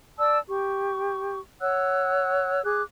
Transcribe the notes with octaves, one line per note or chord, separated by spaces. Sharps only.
D5 A5 E6
G4 C#6
C#5 F#5 E6 F#6
G#4 D6 F#6